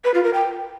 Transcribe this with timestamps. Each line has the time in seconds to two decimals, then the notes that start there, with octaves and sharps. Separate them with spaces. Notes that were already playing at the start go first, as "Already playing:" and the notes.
0.04 B4
0.14 F4
0.24 A#4
0.33 G5